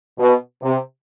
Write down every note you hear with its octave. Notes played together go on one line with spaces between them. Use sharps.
B2
C3